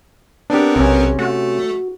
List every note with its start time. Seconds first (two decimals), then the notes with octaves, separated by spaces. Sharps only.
0.50 B3 C4 D4 G4 A#4
0.76 B1 C3 C#4
1.19 A3 F#4